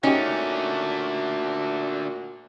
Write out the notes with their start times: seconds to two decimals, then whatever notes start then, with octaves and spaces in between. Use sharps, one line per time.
0.03 A#2 D3 A3 C#4 D#4 F#4 G4